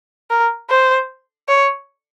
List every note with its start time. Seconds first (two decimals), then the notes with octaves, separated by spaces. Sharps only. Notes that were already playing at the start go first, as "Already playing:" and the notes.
0.30 A#4
0.69 C5
1.48 C#5